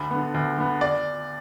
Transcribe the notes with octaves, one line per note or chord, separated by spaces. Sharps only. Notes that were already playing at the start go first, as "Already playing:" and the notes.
Already playing: D2 B5
D3 B3
D2
D3 B3
D5